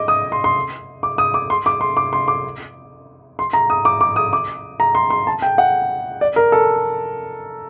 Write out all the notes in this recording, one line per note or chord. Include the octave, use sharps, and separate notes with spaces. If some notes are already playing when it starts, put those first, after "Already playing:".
Already playing: D#5 D6
D#6
C6
C6
D6
D#6
D6
C6
D6
C6
D6
C6
D6
C6
A#5
D#6
D6
D6
D#6
D6
A#5
C6
C6
A5
G5
F#5
D5
A#4
A4